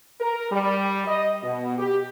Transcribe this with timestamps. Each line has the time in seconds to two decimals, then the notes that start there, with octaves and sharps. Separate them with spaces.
0.20 A#4
0.51 G3
1.07 D#5
1.43 B2
1.78 G4